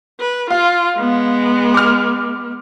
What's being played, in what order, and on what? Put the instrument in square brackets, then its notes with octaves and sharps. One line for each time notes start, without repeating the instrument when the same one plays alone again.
[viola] B4
[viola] F4 [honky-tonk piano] F5
[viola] G#3 B3
[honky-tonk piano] D6 F6